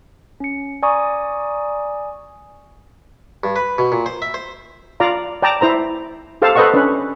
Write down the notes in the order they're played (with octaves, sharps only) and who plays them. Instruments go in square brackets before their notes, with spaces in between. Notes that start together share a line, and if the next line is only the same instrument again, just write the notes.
[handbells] C#4 C#7
D5 G#5 A#5 C#6 D#6
[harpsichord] G2
B4
B2
A#2
C5
E5
C5
[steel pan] F4 D5 F5 A#5
D5 G5 A5 A#5 D6
E4 C5 A#5
G4 A4 C5 F5 A5
A4 B4 C5 D#5 F#5 C#6
C#4 D4 B4